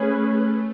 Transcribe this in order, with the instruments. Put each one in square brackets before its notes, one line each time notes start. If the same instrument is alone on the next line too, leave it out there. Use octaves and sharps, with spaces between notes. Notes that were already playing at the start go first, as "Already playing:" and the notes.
Already playing: [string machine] A3 [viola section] C#4 G#4 B4